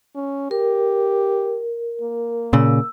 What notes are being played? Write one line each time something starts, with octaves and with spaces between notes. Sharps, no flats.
C#4
G4 A#4
A#3
A#2 C#3 E6